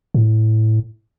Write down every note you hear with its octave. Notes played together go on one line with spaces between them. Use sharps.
A2